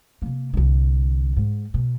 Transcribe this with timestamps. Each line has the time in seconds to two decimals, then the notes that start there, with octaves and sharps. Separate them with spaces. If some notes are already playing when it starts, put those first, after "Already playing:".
0.22 C3 A#3
0.54 C2 D3
1.36 G#2
1.74 B2